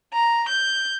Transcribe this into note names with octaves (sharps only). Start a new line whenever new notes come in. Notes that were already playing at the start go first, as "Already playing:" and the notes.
A#5
G6